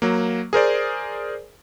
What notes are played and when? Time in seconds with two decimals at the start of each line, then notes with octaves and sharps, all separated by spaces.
0.02 F#3 A#3
0.53 G#4 A#4 C5 D5